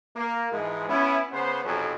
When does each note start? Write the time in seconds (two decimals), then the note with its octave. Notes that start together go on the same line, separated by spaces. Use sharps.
0.16 A#3
0.52 G#2 E3 F3 G#3
0.89 B3 C#4 E4
1.32 C#3 B3 C5
1.65 B1 F2 C3 F#3 G#4